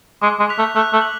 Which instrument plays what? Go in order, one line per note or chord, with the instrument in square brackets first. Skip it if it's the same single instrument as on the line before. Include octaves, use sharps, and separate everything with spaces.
[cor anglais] G#3 [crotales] D6
[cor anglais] G#3
[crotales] F#6 B6 F7
[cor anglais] A3
[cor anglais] A3 [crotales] F#6
[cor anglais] A3
[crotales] F#7